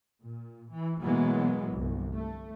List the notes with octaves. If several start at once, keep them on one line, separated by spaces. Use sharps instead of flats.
A#2
E3
B2 E3 F#3 G#3 A#3 B3
G1 C2
A3